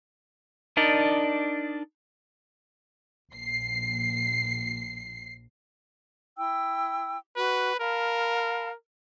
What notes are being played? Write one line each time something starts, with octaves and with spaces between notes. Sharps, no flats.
D4 D#4 A#4 D5 D#5
A#1 C7
E4 G5 E6
F#4 B4
A#4 F5 A5 B5